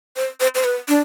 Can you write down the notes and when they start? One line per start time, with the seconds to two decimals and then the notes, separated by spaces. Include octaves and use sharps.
0.16 C5
0.40 C5
0.55 C5
0.64 B4
0.88 D4